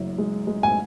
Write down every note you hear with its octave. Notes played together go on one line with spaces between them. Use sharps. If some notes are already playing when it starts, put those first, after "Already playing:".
Already playing: F#1 F#2
G#3
G#3
G#5